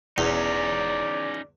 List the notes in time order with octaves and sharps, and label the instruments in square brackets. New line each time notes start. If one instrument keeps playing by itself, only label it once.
[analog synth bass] E1 [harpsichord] E2 [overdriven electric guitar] C#4 D#4 [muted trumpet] D5